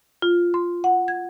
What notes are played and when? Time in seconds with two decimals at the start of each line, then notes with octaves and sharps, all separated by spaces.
0.22 F4
0.54 C6
0.84 F#5
1.08 G#6